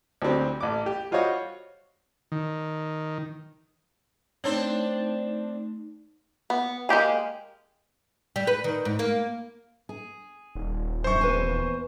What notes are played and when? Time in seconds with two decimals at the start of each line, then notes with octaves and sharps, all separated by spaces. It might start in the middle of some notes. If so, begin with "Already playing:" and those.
0.22 D2 F#3 G3 C4
0.61 A1 D6
0.86 G4
1.11 G3 F4 F#4 C5 C#5 D#5
2.32 D#3
4.44 A3 C4 D4 D#4 C5 C#5
6.50 B3
6.89 G#3 A#3 G4 G#4
8.36 G3
8.47 B4
8.64 D#3
8.85 G#2
8.99 A#3
9.89 G#4
10.55 D#1
11.04 F#2 C5 C#6
11.21 E2 B4 G#5